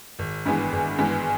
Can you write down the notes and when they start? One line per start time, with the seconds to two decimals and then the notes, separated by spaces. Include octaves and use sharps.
0.19 G#1
0.45 G2 E3 G#3 B3
0.73 G#1
0.98 G2 E3 G#3 B3